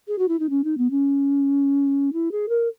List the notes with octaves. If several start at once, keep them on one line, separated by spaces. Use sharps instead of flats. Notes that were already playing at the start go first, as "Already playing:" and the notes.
G#4
F#4
E4
D#4
C#4
D#4
B3
C#4
E4
G#4
A#4